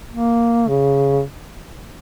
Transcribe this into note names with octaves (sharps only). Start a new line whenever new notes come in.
A#3
C#3